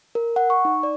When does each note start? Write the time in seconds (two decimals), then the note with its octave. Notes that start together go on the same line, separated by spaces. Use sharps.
0.15 A#4
0.36 F#5
0.50 C#6
0.65 D#4
0.83 D5